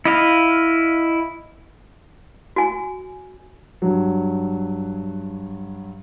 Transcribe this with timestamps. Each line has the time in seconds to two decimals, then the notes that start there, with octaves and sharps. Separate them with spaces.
0.05 E4 D#5 F5
2.56 F#4 G#5
3.82 G2 F#3